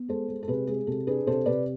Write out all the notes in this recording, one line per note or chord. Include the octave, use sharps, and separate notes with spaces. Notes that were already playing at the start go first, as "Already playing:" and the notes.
Already playing: B3
G#3 A4 C5
G#3
A4
C3 G#4 B4
G#3 G#4
C3 A4
D4 G#4 B4
C3 A4 C5
C3 B4 D5